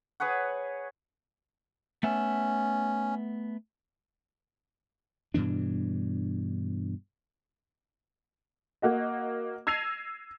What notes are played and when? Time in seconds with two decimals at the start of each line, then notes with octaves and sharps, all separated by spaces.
0.20 G#4 B4 C#5 F#5
2.03 A3 B3 C#4 E5
5.34 G2 B2 E3 D4
8.82 A#3 F#4 D#5
9.67 E6 G#6 A#6 C7 D#7 F7